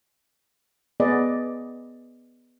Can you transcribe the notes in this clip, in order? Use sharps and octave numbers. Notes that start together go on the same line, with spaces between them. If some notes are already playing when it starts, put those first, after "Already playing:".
B3 G#4 B4 D5 D#5